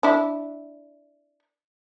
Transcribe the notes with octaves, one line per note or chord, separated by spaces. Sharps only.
D4 E4